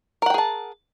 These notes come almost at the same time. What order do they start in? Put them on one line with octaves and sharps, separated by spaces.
A#4 F#5 G5 G#4 A5